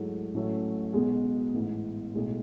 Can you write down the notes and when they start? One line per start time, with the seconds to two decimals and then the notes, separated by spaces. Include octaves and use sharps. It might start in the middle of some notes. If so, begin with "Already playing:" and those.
Already playing: G#2 F#3 A3 E4 G#4
0.34 A1 A2 F#3 A3 C#4
0.93 B1 B2 G#3
1.54 A1 G#2 E3 B3
2.14 B1 A2 G#3